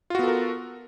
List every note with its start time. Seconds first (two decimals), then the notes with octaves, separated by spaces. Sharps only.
0.10 F4
0.15 F#4
0.19 B3
0.23 A4
0.28 A#4